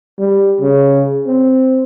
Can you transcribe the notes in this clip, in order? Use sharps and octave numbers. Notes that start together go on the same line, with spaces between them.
G3
C#3
C4